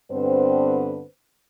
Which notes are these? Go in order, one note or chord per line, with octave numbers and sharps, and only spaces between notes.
G2 D3 B3 C4 B4 C5